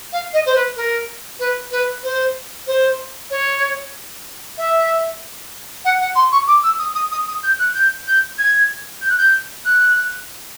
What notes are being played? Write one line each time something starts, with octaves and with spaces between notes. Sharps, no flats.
F5
D#5
C5
B4
A#4
B4
B4
C5
C5
C#5
E5
F#5
F#5
C6
C#6
D6
E6
D#6
D#6
D#6
D#6
G6
F#6
G6
G6
G#6
G6
F#6
G6
F#6